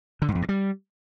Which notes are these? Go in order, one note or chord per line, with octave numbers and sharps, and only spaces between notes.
D3
G#2
F2
G2
G3